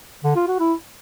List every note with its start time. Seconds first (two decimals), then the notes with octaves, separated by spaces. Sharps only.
0.24 D3
0.36 F4
0.48 F#4
0.60 E4